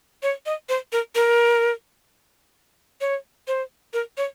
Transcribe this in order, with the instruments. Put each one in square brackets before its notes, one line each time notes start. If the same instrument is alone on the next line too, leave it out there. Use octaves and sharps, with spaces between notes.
[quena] C#5
D#5
C5
A#4
A#4
C#5
C5
A#4
C#5